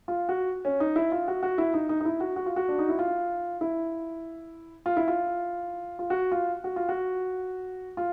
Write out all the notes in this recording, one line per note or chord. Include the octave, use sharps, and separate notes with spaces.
F4
F#4
C#4
D#4
E4
F4
F#4
F#4
E4
D#4
D#4
D#4
E4
F#4
F#4
F4
F#4
D4
D#4
E4
F4
E4
F4
E4
F4
F4
F#4
F4
F#4
F4
F#4
F4